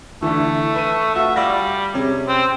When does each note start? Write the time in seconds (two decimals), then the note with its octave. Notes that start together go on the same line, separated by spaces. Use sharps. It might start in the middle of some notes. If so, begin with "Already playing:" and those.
0.22 D3 E3 A3
0.75 B4 D#7
1.16 F#4 E5 F5
1.36 G3 F4 D5 A#6
1.94 C3 C#4 G#4
2.29 C4